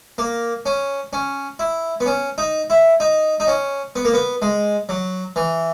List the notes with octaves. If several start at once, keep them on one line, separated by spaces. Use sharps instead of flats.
A#3
C#4
C#4
E4
B3
C#4
D#4
E4
D#4
D#4
C#4
B3
A#3
B3
G#3
F#3
E3